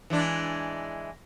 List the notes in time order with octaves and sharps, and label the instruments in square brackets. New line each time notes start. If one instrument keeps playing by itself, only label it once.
[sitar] E3 G#3 D4